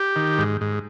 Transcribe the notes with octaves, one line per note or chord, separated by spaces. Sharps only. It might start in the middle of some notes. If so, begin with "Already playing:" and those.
Already playing: G4
D#3
G#2
G#2